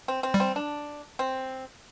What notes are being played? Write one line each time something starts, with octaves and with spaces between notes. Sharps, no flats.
C4
C4
G3
C4
D4
C4